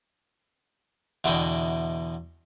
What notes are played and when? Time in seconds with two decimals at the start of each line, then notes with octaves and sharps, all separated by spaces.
1.24 E2 B2 D3 E4 D#5 G5